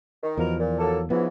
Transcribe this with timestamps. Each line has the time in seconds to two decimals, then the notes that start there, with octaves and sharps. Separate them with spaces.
0.23 D#3
0.37 E2 B2 F3 A#4
0.58 A#2
0.79 F#3 A#3 A4
1.10 G#2 C#3 E3 F3 B3